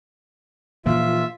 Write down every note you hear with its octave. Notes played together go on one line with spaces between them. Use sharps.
A#2 E3 F3 F4 E5